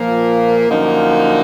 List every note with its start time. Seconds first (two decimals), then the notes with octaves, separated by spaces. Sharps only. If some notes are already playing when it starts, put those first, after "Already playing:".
Already playing: A#2 F3 A#3
0.69 F#2 D3 F3 A#3 D#4